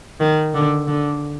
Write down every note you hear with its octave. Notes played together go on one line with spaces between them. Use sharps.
D#3
D3
D3